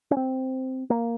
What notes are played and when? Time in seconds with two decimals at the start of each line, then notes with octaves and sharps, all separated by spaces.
0.11 C#4
0.17 C4
0.90 A#3